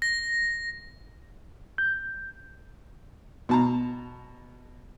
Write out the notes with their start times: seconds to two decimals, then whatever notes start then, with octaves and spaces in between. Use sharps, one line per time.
0.02 A#6
1.78 G6
3.49 B2 A5 A#5